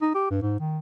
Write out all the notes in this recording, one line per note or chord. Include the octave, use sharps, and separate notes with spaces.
D#4
G4
G2
G#2
D#3